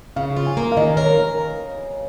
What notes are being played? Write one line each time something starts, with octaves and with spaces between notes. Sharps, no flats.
C#3 F5
F4
G#5
A#3
F5
D#3 D#5
A#4 C#5